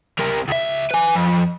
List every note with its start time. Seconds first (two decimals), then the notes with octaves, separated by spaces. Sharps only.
0.19 C3 A#4
0.48 C#2 E5
0.91 B4 G#5
1.15 F2